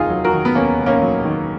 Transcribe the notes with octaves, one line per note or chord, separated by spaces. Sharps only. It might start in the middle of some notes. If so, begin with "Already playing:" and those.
Already playing: F1 D#2 D#4 F4 G#4
F#3
F#4 A#4
D#3
B3
D#2 A#3 C#4
F1
A#3 C#4
F#3
D#3